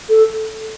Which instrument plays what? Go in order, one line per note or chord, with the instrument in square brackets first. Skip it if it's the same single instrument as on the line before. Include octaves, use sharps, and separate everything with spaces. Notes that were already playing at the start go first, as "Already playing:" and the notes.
[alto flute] A4